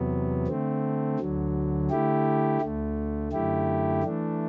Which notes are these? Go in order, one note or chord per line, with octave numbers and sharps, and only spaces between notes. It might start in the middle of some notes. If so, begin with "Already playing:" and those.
Already playing: E2 C3 F#3 B3
D3 A3 C4
D2 D3 F#3
D3 A3 E4 G4
D2 D3 A3
F#2 D3 A3 E4 G4
E3 A3 D4